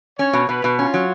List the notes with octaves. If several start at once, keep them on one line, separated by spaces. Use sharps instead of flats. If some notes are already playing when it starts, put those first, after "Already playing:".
C#4 C#5
B2
B2 B4
B2
C#4 F4
F#3